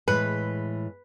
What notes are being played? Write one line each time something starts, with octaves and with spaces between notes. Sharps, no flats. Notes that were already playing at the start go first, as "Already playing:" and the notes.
A2 E3 G#3 B4